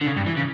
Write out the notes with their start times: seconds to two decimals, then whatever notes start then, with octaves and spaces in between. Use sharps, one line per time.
0.01 D3
0.06 C#3
0.16 G2
0.27 E3
0.37 C#3